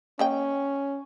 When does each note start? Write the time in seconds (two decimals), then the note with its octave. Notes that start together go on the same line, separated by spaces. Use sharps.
0.19 A#3 C#4 D#5 G5